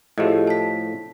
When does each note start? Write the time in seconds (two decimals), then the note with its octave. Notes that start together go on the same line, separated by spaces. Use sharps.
0.18 A2 F3 A3 G4 G#4 D#5
0.47 A5 B6